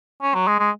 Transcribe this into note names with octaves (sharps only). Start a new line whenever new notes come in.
C#4
F#3
G#3
G#3